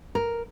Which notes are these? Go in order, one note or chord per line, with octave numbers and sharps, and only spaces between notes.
A#4